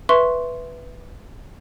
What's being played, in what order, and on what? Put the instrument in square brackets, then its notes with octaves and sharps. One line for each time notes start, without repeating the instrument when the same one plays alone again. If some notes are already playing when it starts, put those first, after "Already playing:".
[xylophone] B4 E5 C6 C#6